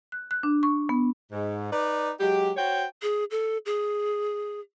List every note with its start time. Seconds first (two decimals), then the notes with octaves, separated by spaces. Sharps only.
0.12 F#6
0.31 F#6
0.43 D4
0.63 C#6
0.89 B3
1.32 G#2
1.71 D#4 B4 D5
2.20 F#3 G#3 G4
2.57 F#4 C5 C#5 G5
3.02 G#4
3.31 A4
3.66 G#4